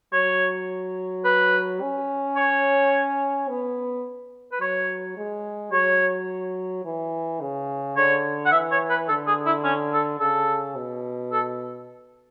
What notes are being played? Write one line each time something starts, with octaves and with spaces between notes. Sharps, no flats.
F#3 C#5
B4
C#4
C#5
B3
B4
F#3 C#5
G#3
F#3 C#5
E3
C#3
D3 C#5
F#5
E3 E5
C#5
B4
D3 A4
G#4
E4
C#4
A4
C#3 A4
B2
A4